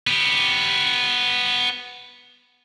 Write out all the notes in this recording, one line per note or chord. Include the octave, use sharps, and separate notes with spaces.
B3 G4